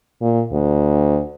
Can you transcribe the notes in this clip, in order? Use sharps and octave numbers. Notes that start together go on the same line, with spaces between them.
A#2
D2